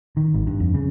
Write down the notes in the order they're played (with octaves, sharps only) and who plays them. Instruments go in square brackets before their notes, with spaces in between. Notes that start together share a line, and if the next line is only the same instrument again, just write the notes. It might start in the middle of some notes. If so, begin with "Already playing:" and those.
[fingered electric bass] D#3
G#1
G2
F2
C#3